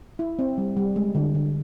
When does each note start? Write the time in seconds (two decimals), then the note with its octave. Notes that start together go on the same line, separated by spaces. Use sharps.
0.19 E4
0.39 C4
0.58 G3
0.77 G3
0.96 G#3
1.15 D3
1.35 D3